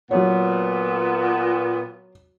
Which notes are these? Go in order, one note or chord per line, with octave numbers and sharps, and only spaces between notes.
A#2 F#3 B3 C#5